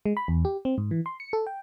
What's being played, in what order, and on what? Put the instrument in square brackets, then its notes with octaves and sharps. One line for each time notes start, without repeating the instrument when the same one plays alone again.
[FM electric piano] G#3
B5
E2
G4
C4
G#2
E3
C6
C#7
A4
G5